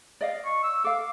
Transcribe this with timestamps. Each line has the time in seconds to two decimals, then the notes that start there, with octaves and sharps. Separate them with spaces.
0.21 D5 D#5 F5
0.45 C#6
0.63 E6
0.84 A4 F5 D6